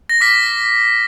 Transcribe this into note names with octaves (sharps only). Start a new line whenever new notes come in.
A#6
D6 F6 B6